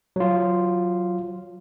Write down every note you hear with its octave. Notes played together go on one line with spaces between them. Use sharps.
F#3 F4